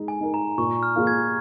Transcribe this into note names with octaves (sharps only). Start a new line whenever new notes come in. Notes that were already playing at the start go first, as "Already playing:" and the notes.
Already playing: G#3 D#4
G#5
D#4 A#4
A#5
A#2 C#6
F6
A#3 F4 G#4 F5
G#6